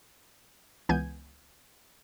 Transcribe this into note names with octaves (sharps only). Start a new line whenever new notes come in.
C#2 E3 B3 G#5 G6 G#6